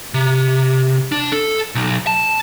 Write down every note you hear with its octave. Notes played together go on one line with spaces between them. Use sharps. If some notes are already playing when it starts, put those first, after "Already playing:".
C3
D4
A4
B1
A5